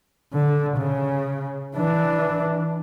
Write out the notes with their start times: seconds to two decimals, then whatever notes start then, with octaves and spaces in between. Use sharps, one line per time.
0.33 D3
0.78 C#3
1.76 E3 D4